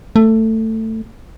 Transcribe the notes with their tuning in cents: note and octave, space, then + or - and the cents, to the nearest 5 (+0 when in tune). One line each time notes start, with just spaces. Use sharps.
A3 +15